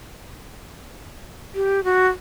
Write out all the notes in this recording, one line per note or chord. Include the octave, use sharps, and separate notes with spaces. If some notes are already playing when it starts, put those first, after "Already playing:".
G4
F#4